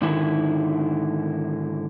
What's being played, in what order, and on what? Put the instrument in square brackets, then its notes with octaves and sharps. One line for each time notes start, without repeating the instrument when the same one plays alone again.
[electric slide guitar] G#2 D3 D#3 E4